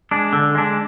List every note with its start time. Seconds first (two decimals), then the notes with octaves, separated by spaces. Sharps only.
0.11 G#3 D4
0.33 D3
0.55 G#3 D4